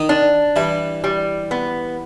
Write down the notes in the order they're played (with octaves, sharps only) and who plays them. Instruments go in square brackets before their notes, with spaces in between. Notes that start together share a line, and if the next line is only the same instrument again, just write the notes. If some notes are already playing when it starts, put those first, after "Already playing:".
Already playing: [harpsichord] D#3 D#4
[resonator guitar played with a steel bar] D4
[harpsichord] E3 E4 [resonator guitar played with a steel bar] G3
[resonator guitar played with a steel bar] G3
B3